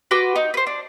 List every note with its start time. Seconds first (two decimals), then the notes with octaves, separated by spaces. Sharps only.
0.11 F#4 B4 C6 D6
0.36 D#4
0.54 B4 C5
0.67 D4